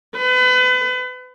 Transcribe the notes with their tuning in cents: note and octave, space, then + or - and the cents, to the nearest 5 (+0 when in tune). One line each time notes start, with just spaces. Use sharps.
B4 +35